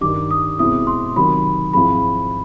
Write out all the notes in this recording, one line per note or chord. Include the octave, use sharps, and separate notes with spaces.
G2 D#3 G3 D6
D#6
B2 G#3 C4 E4 D#6
C6
C3 D#3 F#3 B5
G#2 F3 G#3 C4 E4 B5